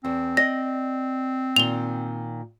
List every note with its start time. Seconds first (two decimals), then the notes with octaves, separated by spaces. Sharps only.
0.05 E2 C4
0.37 D5 D#5 A#6
1.56 A#2 D#3 F7 G7